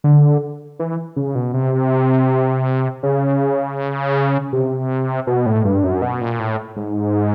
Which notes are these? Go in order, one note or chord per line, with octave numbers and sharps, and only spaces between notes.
D3
E3
C#3
B2
C3
C#3
C3
B2
A2
G2
F#2
B2
A#2
A2
G#2